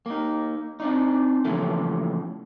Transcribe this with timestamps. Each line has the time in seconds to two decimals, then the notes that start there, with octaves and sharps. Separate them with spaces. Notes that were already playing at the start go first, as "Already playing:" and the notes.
0.06 A#3 D#4
0.80 C4 D4 D#4
1.45 C#3 E3 F3 G3 A3 A#3